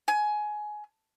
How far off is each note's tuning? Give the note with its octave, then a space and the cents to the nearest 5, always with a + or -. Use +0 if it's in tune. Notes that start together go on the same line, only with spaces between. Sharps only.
G#5 +20